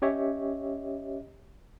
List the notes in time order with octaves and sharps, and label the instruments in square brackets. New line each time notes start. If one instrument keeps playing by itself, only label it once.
[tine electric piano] C#4 G4 C#5 D#5 E5